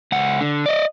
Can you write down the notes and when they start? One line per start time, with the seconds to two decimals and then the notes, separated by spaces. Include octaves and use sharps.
0.12 C#2 F#5
0.41 D3
0.66 D5 D#5